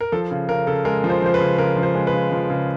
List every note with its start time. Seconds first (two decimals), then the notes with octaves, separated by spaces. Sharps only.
0.01 A#4
0.12 F3 A4
0.31 C#3
0.49 C#3 A#4
0.67 C#3 A4
0.85 G#3 A#4
1.04 F3
1.10 C5
1.22 F3 C5
1.34 B4
1.40 C#3
1.58 C#3 A#4
1.76 F3
1.83 C5
1.95 G#3
2.07 B4
2.13 C#3
2.32 F3
2.50 C#3